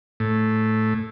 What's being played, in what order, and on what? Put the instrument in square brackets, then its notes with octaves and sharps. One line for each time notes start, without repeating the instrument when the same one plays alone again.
[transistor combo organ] A2